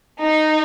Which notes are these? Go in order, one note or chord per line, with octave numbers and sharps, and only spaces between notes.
D#4